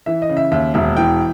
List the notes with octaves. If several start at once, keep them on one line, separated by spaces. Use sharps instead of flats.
E3 E5
D#5
C#3
E5
D#2 E5
E1 E5
E3 G5